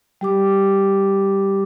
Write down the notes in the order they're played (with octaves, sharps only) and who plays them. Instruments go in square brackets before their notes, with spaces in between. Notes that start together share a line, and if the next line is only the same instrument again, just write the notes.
[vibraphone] G3 G4 D6